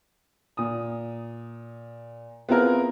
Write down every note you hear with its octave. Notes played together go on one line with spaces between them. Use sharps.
A#2 D#6
B3 C4 E4 F4 G#4 A#4